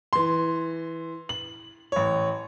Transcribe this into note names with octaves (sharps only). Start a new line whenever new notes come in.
E3 C6
F#7
A1 C#5